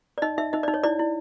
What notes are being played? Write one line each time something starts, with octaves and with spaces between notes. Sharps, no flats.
D5
D#4 D#5
D#4 E5
D#4 D#5
D5
D#4
C#5
E4 D5
E4